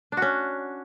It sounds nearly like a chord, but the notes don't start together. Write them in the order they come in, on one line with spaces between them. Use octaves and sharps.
D4 F#4 C#4